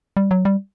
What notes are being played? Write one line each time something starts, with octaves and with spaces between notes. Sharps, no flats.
G3
F#3
G3